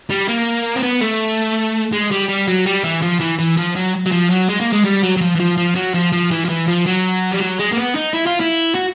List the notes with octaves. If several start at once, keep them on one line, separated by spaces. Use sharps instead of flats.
G3
A#3
C4
B3
A3
G#3
G3
G3
F#3
G3
E3
F3
E3
E3
F3
F#3
F#3
F3
F#3
G#3
A#3
G#3
G3
F#3
F#3
F3
E3
F3
F3
F#3
F3
F3
E3
F3
E3
F3
F#3
G3
F#3
G#3
A#3
B3
D#4
E4
F4
E4
F#4